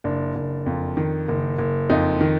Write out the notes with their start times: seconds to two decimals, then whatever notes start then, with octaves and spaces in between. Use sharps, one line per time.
0.04 F#1 D4
0.35 F#1
0.66 F2
0.97 D#3
1.28 F#1
1.58 F#1
1.90 F2 D#4
2.21 D#3